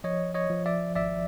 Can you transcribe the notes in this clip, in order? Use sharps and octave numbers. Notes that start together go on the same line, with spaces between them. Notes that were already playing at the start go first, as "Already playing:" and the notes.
F3 C#5 D#5
C#5 D#5
F3
D5 E5
G#1 D5 E5